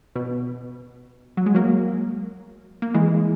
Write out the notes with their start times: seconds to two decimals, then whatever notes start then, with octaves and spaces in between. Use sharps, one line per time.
0.15 B2
1.37 F#3
1.46 G#3
1.55 F#3 A#3
2.82 A#3
2.94 E3 G#3